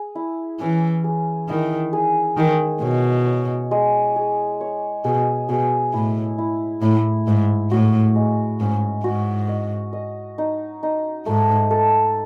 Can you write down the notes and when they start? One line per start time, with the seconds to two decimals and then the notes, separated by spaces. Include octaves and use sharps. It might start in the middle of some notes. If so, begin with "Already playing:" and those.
Already playing: G#4
0.15 E4
0.60 E3 C#4
1.04 G#4
1.49 D#3 E4
1.93 G#4
2.37 D#3 G#3
2.82 B2 C#5
3.26 C#5
3.71 G#3
4.16 G#4
4.61 C#5
5.04 B2 G#4
5.49 B2 G#4
5.93 A2 E4
6.38 E4
6.82 A2 E4
7.27 G#2 E5
7.71 A2 F#4
8.15 G#3
8.60 G#2 C#4
9.04 G#2 F#4
9.48 D#5
9.93 D#5
10.38 D#4
10.83 D#4
11.26 G#2 A3
11.71 A4